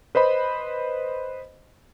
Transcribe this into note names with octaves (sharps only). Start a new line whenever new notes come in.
B4 C5 D#5 B5